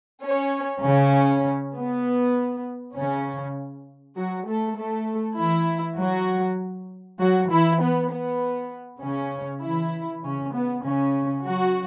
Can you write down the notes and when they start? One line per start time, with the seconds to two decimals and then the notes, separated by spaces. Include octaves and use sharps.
0.23 C#4 C#5
0.84 C#3 C#4
1.75 B3
2.96 C#3 C#4
4.17 F#3 F#4
4.47 A3 A4
4.78 A3 A4
5.38 E3 E4
5.99 F#3 F#4
7.20 F#3 F#4
7.51 E3 E4
7.81 B3
8.10 B3
9.01 C#3 C#4
9.62 E3 E4
10.23 C#3 C#4
10.53 B3
10.83 C#3 C#4
11.44 F#3 F#4